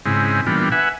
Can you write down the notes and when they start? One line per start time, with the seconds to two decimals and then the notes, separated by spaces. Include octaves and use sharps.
0.06 G#2 C#3 G#3 C4 E4
0.47 A#2 E3 G3 B3 D4 F4
0.72 B4 E5 F#5 G#5